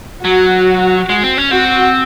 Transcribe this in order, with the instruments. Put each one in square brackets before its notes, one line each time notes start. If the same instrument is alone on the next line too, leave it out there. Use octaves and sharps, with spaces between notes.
[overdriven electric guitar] F#3 [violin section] F#4
[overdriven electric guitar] G#3
C4
C#4
[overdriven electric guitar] C4 [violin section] F#4